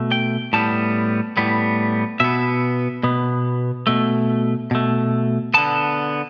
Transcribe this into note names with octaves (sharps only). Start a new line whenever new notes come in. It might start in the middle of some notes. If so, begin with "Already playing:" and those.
Already playing: B2 A3
G5
A2 G3 B3 A5
A2 G3 B3
B2 B3 E5
B2 B3
B2 A3
B2 A3
D3 B3 A5